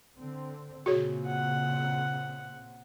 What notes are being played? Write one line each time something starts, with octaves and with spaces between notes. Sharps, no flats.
D3 C4
A#2 C#3 C4 F#4 G#4 C#5
F#5